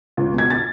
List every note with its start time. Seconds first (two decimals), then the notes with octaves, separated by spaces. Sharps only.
0.17 C#2
0.34 B2 G#6
0.50 A6